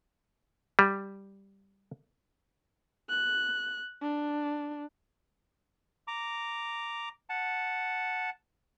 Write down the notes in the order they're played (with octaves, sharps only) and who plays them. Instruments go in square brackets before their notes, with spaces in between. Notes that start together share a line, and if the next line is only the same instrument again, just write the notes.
[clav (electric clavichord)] G3
[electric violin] F#6
D4
[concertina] A#5 D6
F#5 A5